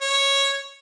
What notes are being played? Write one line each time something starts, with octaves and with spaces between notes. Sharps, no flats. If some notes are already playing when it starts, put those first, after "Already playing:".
C#5